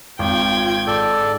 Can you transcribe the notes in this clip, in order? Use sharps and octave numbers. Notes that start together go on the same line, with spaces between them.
G#1 F4 G5 G#6
G#2 A4 D5